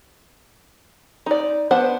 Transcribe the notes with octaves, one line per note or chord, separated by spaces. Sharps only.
D#4 D5
B3 D4 B4 C5 F#5